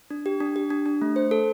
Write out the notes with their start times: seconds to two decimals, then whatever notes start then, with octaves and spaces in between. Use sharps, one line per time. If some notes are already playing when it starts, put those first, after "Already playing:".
0.11 D4
0.26 G4
0.40 D4
0.56 G4
0.70 D4
0.86 D4
1.01 A3
1.16 C5
1.31 A4